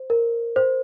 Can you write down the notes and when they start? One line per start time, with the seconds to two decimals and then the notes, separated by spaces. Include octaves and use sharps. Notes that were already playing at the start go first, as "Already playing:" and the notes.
Already playing: C5
0.10 A#4
0.56 C5